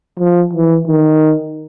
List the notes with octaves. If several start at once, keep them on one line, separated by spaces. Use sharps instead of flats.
F3
E3
D#3